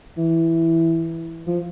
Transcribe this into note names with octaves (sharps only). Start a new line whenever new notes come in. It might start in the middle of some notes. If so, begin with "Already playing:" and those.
E3
F3